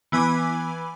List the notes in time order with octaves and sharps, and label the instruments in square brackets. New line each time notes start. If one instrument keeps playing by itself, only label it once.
[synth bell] E3 B3 G#5 B5 D6